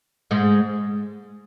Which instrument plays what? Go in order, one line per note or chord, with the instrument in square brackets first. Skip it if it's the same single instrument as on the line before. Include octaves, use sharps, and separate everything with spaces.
[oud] G#2 G#3